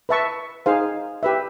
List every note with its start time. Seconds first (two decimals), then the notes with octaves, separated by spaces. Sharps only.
0.09 B4 E5 A5 C#6
0.66 D#4 G#4 C5 F5
1.23 G4 B4 E5